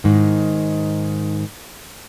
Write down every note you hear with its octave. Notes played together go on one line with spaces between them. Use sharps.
G#2 D#3